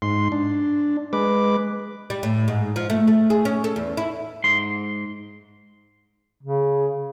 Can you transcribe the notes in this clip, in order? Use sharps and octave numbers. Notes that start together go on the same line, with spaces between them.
G#2 C6
D4
G#3 B4 D6
G3
A2
G#2
F3
A3
A3
G#4
C#4
A4
E2
E4
G#2 C6
C#3